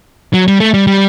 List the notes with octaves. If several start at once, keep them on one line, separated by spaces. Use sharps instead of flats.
F#3
G3
A3
G3
G3